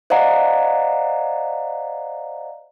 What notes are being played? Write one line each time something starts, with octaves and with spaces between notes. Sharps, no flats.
C5 D5 D#5 F5 F#5 A#5